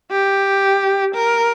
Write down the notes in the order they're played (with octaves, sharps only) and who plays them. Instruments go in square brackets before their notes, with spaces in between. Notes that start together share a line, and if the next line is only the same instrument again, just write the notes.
[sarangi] G4
A#4